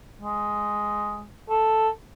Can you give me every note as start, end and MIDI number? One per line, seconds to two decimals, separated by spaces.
0.21 1.27 56
1.50 1.89 69